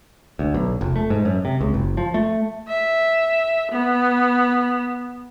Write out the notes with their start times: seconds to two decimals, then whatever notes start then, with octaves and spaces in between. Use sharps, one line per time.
0.39 D2
0.54 B1
0.81 F1
0.96 A3
1.10 G#2
1.25 F#2
1.45 C3
1.60 C#2
1.74 F#1
1.97 F3
2.14 A3
2.68 E5
3.72 B3